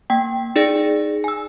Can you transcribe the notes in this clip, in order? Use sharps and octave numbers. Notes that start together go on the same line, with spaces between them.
A#3 G5
D#4 G#4 D5 A#6 C#7
G#5 E6